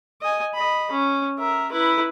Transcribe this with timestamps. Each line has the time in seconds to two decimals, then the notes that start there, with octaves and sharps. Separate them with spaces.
0.21 D#5 G#5
0.55 D#5 B5
0.91 C#4
1.39 A#4 E5
1.72 E4 B4